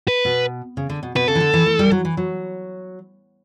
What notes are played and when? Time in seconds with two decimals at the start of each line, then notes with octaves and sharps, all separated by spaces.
0.08 B4
0.25 B2
0.77 C#3
0.90 D3
1.03 B2
1.15 B2 B4
1.28 C#3 A4
1.35 E3
1.40 D3
1.54 E3
1.66 A3
1.79 G3
1.91 F#3
2.05 E3
2.17 F#3